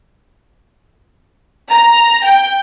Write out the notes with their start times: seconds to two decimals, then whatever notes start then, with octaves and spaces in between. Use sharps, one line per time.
1.70 A#5
2.24 G5